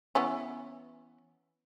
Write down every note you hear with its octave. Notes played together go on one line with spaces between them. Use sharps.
E3 B3 C#4